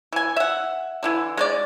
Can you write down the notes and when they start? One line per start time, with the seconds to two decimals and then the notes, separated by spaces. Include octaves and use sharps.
0.13 E3 G#5
0.36 E5 F#5
1.03 D3 E3 E4
1.37 G#3 C5 D5